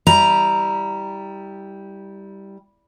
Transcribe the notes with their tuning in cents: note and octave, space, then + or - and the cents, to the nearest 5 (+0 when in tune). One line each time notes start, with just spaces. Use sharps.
G3 +0 E4 -20 A#5 +0